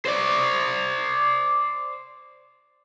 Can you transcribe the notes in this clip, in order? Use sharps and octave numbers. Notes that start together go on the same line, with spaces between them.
C5 D5